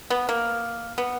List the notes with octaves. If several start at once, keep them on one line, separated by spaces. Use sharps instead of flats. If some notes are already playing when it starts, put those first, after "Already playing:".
B3
A#3
B3